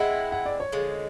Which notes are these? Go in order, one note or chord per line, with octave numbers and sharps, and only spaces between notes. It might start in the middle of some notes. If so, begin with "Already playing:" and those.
Already playing: G#3 C4 E4 F#5
F#5
D5
C#5
D3 F3 G#3